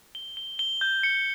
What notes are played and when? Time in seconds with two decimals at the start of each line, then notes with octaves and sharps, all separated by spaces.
0.15 G7
0.37 G7
0.59 G7
0.81 G6
1.03 C#7